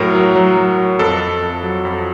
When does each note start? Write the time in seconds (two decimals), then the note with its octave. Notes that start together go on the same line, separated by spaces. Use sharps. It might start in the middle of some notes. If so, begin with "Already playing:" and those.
Already playing: A2 F#3 A#4
0.15 F#3
0.35 F#3
0.57 F#3
0.78 F#3
0.99 F2 A4
1.21 F2
1.42 F2
1.63 F#3
1.85 F2